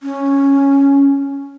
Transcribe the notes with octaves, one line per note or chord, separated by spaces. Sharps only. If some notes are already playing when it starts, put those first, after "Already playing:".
C#4